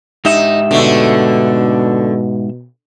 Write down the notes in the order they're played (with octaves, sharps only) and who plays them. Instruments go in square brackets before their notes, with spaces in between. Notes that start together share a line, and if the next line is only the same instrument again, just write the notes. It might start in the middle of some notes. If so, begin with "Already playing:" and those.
[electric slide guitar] G#2 G4 E5 [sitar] D#4
[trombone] B2 [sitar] D3 A3